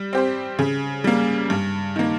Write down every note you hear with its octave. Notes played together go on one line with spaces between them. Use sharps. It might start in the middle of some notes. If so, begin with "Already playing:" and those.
Already playing: G3
C4 G4 C5
C#3
G3 A#3
G2
D#3 A#3